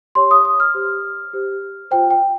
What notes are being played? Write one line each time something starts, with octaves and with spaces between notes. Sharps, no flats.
G4 C#5 C6
D#6
D#6
F6
G4 C5
G4 C5
F4 C5 G5
G5